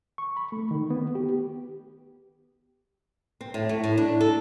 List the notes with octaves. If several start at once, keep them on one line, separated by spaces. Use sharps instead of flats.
C#6
B5
A3
D#3
B3
G4
C4
A2
A3
A2
D4
A4